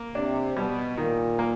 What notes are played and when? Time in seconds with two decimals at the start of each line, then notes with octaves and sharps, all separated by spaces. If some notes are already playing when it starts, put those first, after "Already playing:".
Already playing: A#3
0.15 C3 D4
0.56 B2 G3
0.97 A#2 D#3
1.39 A#3